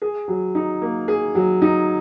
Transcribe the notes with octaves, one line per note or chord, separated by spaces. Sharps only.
G#4
F#3
D#4
A#3
G#4
F#3
D#4